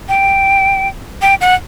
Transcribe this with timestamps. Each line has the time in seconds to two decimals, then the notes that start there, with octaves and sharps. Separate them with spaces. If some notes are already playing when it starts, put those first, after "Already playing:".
0.09 G5
1.22 G5
1.41 F#5